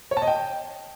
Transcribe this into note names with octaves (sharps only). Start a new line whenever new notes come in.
C#5
A5
D#5
G5